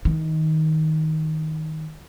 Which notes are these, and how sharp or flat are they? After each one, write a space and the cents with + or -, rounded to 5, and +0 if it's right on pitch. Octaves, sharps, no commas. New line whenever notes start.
D#3 +15